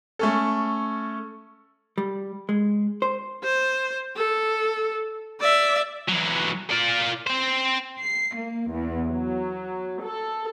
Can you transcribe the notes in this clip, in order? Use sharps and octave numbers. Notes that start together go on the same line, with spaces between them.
A3 C#4 A4
G3
G#3
C5
C5
A4
D5 E5
E3 F#3
F4 D5
C4 C5
C7
A#3
E2
F#3
A4